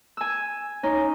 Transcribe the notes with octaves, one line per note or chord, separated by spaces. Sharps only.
G#5 E6
C#4 D#4